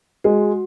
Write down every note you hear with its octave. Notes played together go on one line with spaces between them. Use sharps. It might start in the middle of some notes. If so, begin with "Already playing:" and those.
G#3 F#4